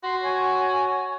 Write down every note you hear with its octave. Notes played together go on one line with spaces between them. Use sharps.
F#4 C6
C#5 G#5